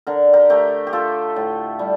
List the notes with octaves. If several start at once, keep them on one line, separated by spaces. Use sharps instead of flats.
D3 A#4
G4 A#4
A3 G4 A#4
G4
A3 F4 A4
A2
G3